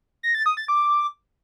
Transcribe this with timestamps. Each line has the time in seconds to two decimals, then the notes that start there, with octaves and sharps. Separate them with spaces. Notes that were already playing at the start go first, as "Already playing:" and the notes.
0.23 A#6
0.34 A6
0.46 D#6
0.57 A6
0.68 D6